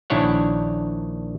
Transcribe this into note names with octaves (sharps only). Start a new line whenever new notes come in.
A#1 D#3 D4 E4 C#5 F#5